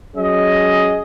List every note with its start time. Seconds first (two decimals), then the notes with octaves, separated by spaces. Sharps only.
0.17 F#3 C#4 G#4 D#5